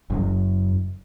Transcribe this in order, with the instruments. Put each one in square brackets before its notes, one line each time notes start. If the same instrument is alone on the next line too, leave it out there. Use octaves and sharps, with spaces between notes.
[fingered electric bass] F#1 F#2 F#3